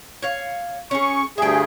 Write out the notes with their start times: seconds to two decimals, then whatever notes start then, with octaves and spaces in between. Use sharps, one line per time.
0.22 C#5 F5
0.91 C#4 G#4 C#6
1.38 D2 G2 G#4 E5 G5